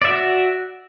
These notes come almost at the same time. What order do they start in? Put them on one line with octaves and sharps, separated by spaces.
D5 E5 F#4